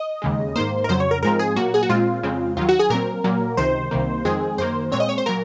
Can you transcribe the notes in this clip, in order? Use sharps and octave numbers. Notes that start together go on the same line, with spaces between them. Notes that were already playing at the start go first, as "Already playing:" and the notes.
Already playing: D#5
D#2 C#3 G#3
G#2 D#3 A#3 C5
A#4
F2 C#3 F#3 C5
C#5
A#4
G#2 F3 G#3 C4 A#4
G#4
A#2 F#3 A#3 F#4
G#4
F#4
A#2 G#3 C4 F4
F2 C#3 G#3 C4
D#2 D#3 F#3 F4
F#4
G#4
A#2 F#3 C4 A#4
A#2 F#3 A#3
C#2 C3 D#3 C5
C2 C3 D#3 A#3
F2 D#3 G#3 C4 G#4
F#2 D#3 A#3 C5
A#2 G#3 C4 C#5
D#5
C#5
C5
A#2 F#3 A#4